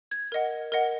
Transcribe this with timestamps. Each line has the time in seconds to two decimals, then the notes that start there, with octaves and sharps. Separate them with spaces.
0.11 G#6
0.32 A#4 D#5 F#5
0.72 A#4 D#5 F#5